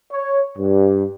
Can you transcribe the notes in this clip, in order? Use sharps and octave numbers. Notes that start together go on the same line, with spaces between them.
C#5
G2